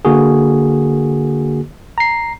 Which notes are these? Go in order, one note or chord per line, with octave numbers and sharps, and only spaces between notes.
D3 A#3 F#4 G#4
A#5 C7